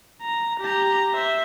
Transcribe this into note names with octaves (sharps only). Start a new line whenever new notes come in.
A#5
G4 A#5
C5 E5